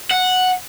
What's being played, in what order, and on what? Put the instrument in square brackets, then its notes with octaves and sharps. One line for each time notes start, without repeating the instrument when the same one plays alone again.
[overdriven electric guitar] F#5